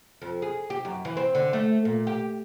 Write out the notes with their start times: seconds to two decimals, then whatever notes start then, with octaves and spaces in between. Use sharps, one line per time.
0.22 F2
0.42 G#4
0.70 G4
0.85 F#2
1.05 E3
1.17 C4
1.35 D3
1.53 A3
1.85 A#2
2.07 G4